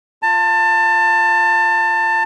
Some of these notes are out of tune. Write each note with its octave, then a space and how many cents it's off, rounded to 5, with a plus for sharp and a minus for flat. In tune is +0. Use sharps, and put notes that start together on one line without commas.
F4 +0 A5 +25